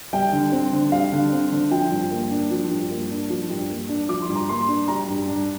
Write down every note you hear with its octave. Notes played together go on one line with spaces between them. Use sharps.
G3 G5
D3
C4
D3
G3 F5
D3
C4
D3
F3 G5
G2
A#3
D4
F3
G2
A#3
D4
F3
G2
A#3
D4
F3 D6
C6
G2
A#5
A#3 C6
D4
G3 A#5
G2
D4